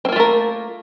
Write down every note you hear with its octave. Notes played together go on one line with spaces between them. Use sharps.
A3 A#3 C4 F4 A#4